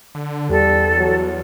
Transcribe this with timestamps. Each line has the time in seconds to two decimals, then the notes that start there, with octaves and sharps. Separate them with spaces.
0.15 D3
0.50 E2 G3 A4
0.98 F#3